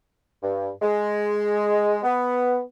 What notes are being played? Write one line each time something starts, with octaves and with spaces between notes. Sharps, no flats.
G2
G#3
B3